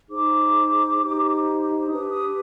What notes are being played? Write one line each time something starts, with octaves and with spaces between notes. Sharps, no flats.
D#4 G#4 C5 D6
D#4 G4 C5
D4 G4 B4 D#6
D#6